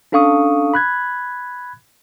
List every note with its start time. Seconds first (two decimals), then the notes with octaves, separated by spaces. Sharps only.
0.12 C#4 D4 A4 F5 C#6 D#6
0.74 B5 F#6 G#6